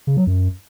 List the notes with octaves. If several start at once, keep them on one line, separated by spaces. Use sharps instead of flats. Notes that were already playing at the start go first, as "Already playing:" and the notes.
C#3
F#3
F#2